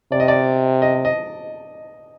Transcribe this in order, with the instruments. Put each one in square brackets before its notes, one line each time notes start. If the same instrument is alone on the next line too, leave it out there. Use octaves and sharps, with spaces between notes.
[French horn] C3 [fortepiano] D5
[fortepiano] D#5
D5
D#5
D#5